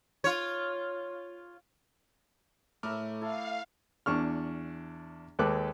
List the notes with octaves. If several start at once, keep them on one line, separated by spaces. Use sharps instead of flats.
F4 C#5
A2 A3 A#4 E5 B5 D6 F6
E4 A4 F5
E2 D4 C#6 F6
D#2 G#3 A4 B4 D6 F#6